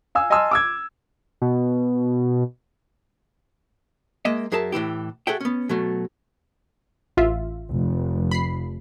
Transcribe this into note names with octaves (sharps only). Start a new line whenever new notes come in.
F5 G#5 E6
D#5 G#5 A5 C6 E6 F6
D6 E6 G#6
B2
G#3 A#3 D#5 E5
F#2 G#4 A#4 E5 A5
A2 E3 E4 G4
F#4 G#4 A4 E5 G5
B3 C#4
B2 F#3 A3
A1 F4 E5
F1
B5 C7